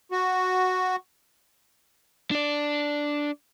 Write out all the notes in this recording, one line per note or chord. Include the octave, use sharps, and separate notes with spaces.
F#4
D4 D5